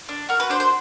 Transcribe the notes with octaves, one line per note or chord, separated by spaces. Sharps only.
D4
F#4 A#4
B4
D4 C5
C5